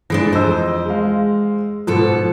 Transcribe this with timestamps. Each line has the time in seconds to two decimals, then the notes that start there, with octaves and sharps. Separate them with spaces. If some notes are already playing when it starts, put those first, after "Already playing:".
0.10 E3 G#3 D4 A#6
0.33 F2 C5 D#5 E6
0.86 G#3 F5
1.87 G#2 B2 F3 A4